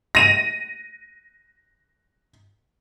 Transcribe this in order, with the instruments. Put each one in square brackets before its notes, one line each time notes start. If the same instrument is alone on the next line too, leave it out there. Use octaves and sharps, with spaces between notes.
[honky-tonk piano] A#6 D#7